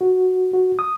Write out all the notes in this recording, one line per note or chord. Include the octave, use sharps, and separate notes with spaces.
F#4
F#4
D#6